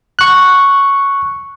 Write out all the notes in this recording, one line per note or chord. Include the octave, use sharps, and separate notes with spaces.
C#6 F#6